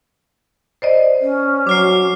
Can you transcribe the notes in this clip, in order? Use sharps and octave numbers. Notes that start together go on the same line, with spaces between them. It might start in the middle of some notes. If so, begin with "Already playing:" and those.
C5 D5 D#5
C#4
F#3 D6 F6 C7